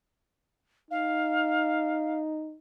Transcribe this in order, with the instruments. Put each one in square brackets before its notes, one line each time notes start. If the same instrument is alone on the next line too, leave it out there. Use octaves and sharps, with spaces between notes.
[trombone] D#4 [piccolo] F5